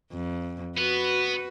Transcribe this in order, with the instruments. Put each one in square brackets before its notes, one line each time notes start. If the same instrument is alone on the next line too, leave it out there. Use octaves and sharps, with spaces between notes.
[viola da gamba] F2
[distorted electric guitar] B3 [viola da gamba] F#4 B4